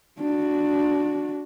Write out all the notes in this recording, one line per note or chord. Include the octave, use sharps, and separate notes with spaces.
D4 F#4